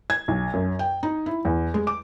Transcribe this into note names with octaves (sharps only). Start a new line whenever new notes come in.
G#6
B1
F#2
G5
D#4
E4
E2
G#3
D6